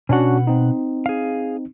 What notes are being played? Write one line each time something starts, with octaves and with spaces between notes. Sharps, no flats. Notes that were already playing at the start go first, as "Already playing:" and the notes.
B2 C#4 D4 F#4 F#5
C4 D#4
G#4 F5